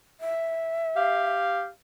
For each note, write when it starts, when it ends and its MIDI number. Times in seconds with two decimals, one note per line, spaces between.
0.21 1.33 76
0.96 1.69 67
0.96 1.69 77